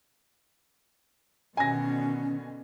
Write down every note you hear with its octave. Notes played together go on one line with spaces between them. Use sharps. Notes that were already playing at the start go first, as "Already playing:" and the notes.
B2 D3 D#3 C#4 G#5 A#6